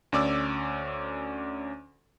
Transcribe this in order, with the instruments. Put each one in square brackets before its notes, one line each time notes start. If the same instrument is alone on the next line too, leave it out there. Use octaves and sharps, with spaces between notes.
[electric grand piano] D2 C#4 D5 D6 E6